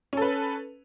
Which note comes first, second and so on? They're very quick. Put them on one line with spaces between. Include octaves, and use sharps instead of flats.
C#4 A4 B4